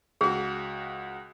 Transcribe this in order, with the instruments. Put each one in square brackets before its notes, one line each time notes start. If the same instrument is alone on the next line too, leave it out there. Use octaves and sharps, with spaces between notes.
[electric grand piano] C#2 F#4 [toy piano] G#4